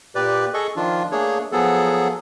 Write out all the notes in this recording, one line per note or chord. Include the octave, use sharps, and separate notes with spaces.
A#2 G4 B4 D5
G#4 A4 D#5 C#6
D#3 F3 D4 F4
A3 A#3 D4 G#4 C#5
F3 F#3 B3 G#4 A4